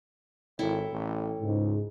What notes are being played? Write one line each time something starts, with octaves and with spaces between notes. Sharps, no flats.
G#1 E4 A4 C#5 G5
A1
C#2 G#2